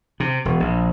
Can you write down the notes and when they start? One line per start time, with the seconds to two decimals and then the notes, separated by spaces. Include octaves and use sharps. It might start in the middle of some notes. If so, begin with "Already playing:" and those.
0.20 C3
0.45 E1
0.60 A#1